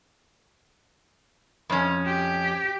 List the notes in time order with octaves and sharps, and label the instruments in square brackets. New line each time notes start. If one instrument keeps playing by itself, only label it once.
[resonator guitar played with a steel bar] F2 C#4
[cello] G4